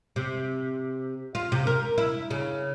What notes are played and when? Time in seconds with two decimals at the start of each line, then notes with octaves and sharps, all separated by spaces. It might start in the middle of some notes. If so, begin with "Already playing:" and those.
0.16 C3
1.35 F4
1.52 C3
1.67 A#4
1.98 E4
2.31 C#3